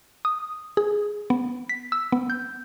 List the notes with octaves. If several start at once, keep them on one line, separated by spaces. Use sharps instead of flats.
D#6
G#4
B3
B6
E6
B3
G6